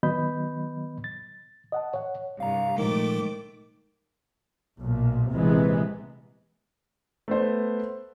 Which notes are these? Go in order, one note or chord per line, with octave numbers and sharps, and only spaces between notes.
D#3 F#3 B3 D#5 B5 G6
A6
D#5 F#5 A5
C#5 F#5
C2 G2 F5 A#5
A#2 D#3 F3 G#3 A3 D6
B1 A#2
A#1 C3 E3 G#3 B3
A3 B3 C5